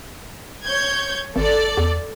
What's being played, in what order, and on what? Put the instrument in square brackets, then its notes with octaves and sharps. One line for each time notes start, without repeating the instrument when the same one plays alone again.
[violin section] C#5 G6 G#6
[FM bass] G#1 [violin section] A4 D5
[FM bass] E2